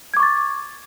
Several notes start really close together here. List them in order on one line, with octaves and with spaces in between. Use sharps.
G#6 D6 C#6 A6